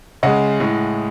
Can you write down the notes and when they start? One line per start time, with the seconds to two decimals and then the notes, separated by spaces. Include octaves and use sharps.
0.23 C#3 G#3 D#5 F#5
0.60 A2 G#3